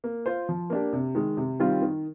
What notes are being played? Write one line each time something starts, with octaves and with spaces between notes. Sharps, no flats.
A#3
F4 C5
F3
A#3 D4 G4
C3
D#3 G#3
C3
D#3 G3 C4 F4
D#3